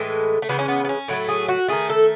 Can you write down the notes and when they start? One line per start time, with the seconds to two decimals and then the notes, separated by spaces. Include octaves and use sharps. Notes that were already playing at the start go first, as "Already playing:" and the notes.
Already playing: A2 E3 G#3 A3
0.42 A3
0.49 C#3 E3 G#3 B3
0.59 C#4
0.68 B3
0.85 B3
0.89 C#4
1.08 A2 F#3 A3 E4
1.29 G#4
1.49 F#4
1.68 D#3 A3 G#4
1.90 A4